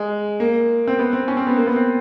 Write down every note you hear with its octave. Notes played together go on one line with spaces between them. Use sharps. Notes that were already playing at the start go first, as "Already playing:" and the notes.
Already playing: G#3
A#3
C4
B3
C4
C#4
C4
B3
A#3
B3
C4